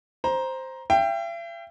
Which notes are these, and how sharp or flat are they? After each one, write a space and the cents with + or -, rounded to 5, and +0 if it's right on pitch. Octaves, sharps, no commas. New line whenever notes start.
C5 +0 A#5 +15
E5 +45 G5 +5